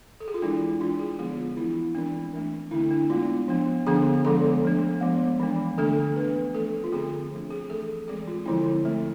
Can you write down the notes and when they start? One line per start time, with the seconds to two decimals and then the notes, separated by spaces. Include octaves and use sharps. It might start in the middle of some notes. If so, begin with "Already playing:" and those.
0.20 A4
0.28 G#4
0.34 F4
0.42 E3 G#3 D4 E4
0.80 G#3 D4 F4
1.00 G#4
1.19 D3 F3 G#3 B3 G#4
1.38 F4
1.57 E3 B3 D4 E4
1.95 E3 G#3 C4 D4
2.33 E3 A3 D4
2.71 D3 A3 C4 E4
2.91 D4
3.10 G#3 B3 D4 F4
3.48 F3 B3 D4
3.87 D3 F3 B3 D4 G#4
4.25 D3 F3 G#3 B3 D4 A4
4.63 F3 A3 D4
5.01 F3 G#3 B3
5.40 E3 G#3 D4
5.78 D3 A3 D4 A4
6.16 E3 B3 D4 B4
6.54 F3 A3 C4 A4
6.84 F4
6.92 D3 A3 C4 G#4
7.31 F3 A3 D4
7.50 G#4
7.70 E3 A3 C4 A4
8.08 E3 G#3 C4 G#4
8.27 F4
8.46 D3 F3 G#3 C4 E4
8.85 D3 A3 C4